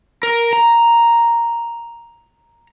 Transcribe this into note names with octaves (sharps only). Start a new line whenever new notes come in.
A#4
A#5